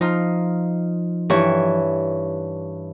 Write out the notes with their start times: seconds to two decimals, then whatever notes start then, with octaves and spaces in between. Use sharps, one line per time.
0.01 F3 D#4 F4
1.30 G2 E3 C#5